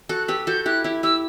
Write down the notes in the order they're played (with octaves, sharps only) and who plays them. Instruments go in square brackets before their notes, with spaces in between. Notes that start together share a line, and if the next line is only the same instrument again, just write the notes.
[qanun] F#4 A4 [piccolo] F#6
[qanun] G4 B4 [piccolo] E6
[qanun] F#4 A4 [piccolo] G6
[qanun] E4 G4 [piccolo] F#6
[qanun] E4 G4
[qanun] E4 G4 [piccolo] E6